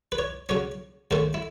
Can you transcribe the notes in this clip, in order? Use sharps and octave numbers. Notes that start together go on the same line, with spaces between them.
B4
C#5
C#3 F#3 C#4 C#5
G#2 D#3 A3 C#4
E4